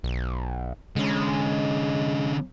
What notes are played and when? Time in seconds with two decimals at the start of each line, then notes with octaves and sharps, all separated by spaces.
0.04 B1
0.96 D3 G#3 C#4